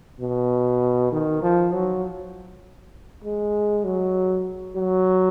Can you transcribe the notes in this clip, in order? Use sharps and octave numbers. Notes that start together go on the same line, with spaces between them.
B2
D#3
F3
F#3
G#3
F#3
F#3